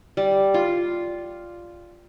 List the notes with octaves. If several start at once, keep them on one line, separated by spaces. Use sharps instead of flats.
G3
F4